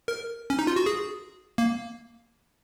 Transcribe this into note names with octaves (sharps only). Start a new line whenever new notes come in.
A#4
C#4
D#4
F4
F#4
G#4
A#3